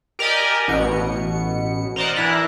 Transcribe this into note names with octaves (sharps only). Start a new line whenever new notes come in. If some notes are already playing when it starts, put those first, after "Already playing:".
G4 A#4 D5 D#5 G#5
A1 B2 C#7
A#4 C5 D5 D#5 F#5
E3 D4 E4 A#4 F#6